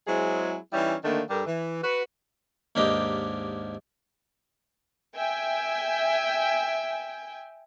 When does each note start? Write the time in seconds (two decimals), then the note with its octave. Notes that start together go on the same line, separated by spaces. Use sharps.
0.08 F#3 G#3 C4 E4 G#4
0.73 E3 G3 C#4 D#4 E4
1.04 D3 D#3 A3 A#3 D4
1.30 G2 G3 D4 A4 A#4
1.46 E3
1.84 F#4 B4
2.75 D#2 G#2 A#3 D4 G4 D#5
5.15 E5 G5 G#5